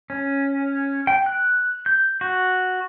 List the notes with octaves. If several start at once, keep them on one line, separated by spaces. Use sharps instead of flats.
C#4
G5
F#6
G6
F#4